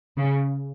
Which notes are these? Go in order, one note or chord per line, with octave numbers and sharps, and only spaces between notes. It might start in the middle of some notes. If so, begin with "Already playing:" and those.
C#3